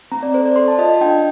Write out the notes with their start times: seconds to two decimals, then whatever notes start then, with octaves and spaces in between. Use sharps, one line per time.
0.12 C4 A#5
0.23 D5
0.34 A4 C5
0.45 D5
0.56 A4 C6
0.68 A5
0.78 F4 D#5
0.90 D#5
1.01 D4 G5